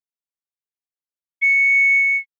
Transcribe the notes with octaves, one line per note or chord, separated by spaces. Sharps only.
C#7